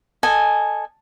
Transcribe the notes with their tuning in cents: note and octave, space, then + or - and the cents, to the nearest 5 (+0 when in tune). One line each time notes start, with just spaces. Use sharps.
A4 +0 D#5 -10 G#5 -10